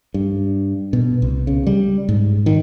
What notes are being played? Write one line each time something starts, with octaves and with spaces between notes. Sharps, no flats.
G2
B2
C2
C#3
G3
G#2
D#3